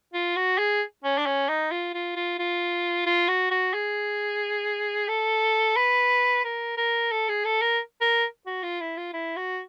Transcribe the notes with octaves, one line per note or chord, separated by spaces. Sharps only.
F4
F#4
G#4
C#4
D4
C#4
D#4
F4
F4
F4
F4
F4
F#4
F#4
G#4
A4
B4
A#4
A#4
A4
G#4
A4
A#4
A#4
F#4
F4
E4
F4
E4
F#4